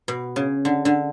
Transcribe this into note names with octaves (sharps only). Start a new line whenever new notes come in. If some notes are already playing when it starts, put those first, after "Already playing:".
B2
C#3
D3
D3